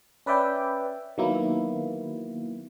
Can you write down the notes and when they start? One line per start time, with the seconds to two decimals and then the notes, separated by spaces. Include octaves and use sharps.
0.26 C#4 B4 D5 E5 G5
1.18 D#3 F#3 A#3 B3 E4